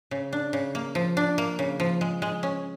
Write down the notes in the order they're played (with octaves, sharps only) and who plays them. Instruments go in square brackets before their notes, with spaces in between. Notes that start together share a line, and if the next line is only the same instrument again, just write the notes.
[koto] C#3
D4
C#3
A#3
F3
D4
A#3
C#3
F3
G#3
G#3
C#4